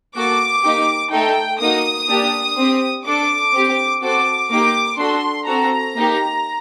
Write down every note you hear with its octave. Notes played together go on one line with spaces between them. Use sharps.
A#3 F#4 A4 D6
A#3 D#4 G4
A3 D#4 A4 G5
A#3 D#4 F#4 D#6
A#3 D4 G4
C4 G4
D4 A4 D6
C4 G4
C4 F#4 A4 D6
A#3 D#4 G4 D6
D4 F#4 A4 C6
C4 F#4 A4 A#5
A#3 D#4 G4